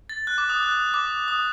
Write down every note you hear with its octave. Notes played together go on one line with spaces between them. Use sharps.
A6
F#6
D6
D#6
F#6
D#6
D6
D#6